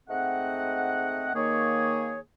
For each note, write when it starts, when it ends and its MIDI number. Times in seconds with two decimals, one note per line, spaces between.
0.09 1.31 44
0.09 1.31 57
0.09 1.31 60
0.09 1.31 75
0.09 1.31 78
1.34 2.18 51
1.34 2.18 58
1.34 2.18 68
1.34 2.18 73